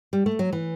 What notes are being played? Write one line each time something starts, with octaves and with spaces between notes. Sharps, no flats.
G3
A3
F#3
E3